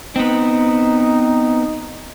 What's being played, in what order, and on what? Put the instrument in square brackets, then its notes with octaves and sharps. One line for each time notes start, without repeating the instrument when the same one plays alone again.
[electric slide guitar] B3 C4 [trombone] D#4